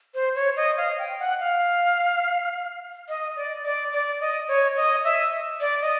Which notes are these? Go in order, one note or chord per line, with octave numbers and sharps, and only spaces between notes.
C5
C#5
D#5
F5
G5
F#5
F5
D#5
D5
D5
D5
D#5
C#5
D#5
E5
D5
D#5